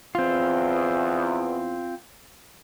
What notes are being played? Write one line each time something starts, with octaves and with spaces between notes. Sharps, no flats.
E2 C4 F4